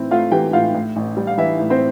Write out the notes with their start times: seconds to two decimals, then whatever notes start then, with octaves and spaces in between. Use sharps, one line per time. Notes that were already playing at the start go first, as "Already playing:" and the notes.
Already playing: A2 E3 C4 E4
0.11 A3 F4 F5
0.32 E3 G4 G5
0.53 A2 F4 F5
0.74 A2
0.96 A1
1.17 G3
1.27 F5
1.38 E3 E4 E5
1.59 A2
1.70 C4 C5